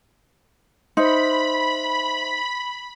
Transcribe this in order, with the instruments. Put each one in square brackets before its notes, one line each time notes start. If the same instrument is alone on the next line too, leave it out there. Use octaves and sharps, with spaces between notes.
[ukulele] D#4 [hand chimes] C5 E5 C6 [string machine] B5